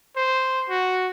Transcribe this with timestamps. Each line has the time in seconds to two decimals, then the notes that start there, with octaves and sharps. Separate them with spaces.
0.16 C5
0.69 F#4